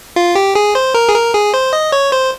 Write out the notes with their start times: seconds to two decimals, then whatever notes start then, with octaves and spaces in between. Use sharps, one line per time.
0.16 F4
0.35 G4
0.55 G#4
0.75 C5
0.94 A#4
1.09 G#4
1.14 A#4
1.34 G#4
1.54 C5
1.73 D#5
1.92 C#5
2.12 C5